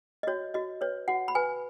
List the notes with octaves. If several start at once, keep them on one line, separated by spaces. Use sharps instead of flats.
D#5
F#4 C#5
F#4 D#5
B4 C#5
F#4 F#5
B5
B4 G#5